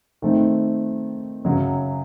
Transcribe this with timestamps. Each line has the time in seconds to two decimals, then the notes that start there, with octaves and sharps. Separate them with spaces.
0.22 D#3 A3 C4
1.45 F#2 C#3 F#3